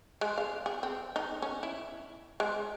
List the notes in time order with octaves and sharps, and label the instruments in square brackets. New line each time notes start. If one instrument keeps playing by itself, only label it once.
[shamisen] G#3
F5
G#4
C4
D#4
C#4
E4
G#3